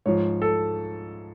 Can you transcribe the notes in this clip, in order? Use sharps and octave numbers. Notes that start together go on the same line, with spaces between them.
G#2 F3 C#5
A4